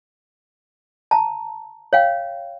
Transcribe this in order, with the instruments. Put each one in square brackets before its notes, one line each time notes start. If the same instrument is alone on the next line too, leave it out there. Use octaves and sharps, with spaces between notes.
[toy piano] A5 A#5
C#5 F5 G5